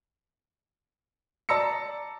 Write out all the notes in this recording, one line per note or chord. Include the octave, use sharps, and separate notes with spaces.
D5 A5 A#5 E6 A#6 C#7